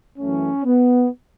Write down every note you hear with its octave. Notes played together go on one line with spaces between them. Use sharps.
F#2 E3 A3 C#4
B3